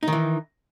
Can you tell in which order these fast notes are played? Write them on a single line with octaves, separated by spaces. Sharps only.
D#4 D#3 E3